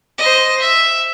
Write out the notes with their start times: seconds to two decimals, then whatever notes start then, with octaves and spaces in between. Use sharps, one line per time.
0.18 C5 D#5
0.61 E5